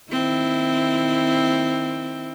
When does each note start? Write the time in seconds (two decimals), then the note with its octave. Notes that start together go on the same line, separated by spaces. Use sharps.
0.12 D#3 C4 E4